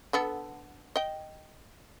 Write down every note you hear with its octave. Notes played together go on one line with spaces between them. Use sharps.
D3 B3 A4
D#5 G5